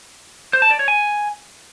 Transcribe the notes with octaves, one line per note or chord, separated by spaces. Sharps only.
C5
A5
D5
C#5
G#5